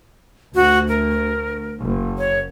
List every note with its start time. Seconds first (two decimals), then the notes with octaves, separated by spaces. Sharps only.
0.55 D2 F#4
0.89 A#4
1.79 F#1
2.18 C#5